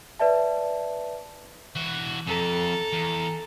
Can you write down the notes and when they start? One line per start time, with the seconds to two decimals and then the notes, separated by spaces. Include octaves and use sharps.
0.19 B4 D5 E5 A5
1.76 E3 F#4
2.27 F2 A4 A#5
2.93 E2